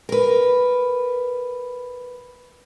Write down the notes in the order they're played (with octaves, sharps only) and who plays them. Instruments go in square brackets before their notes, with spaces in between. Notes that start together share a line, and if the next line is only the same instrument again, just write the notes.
[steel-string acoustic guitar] A#4 B4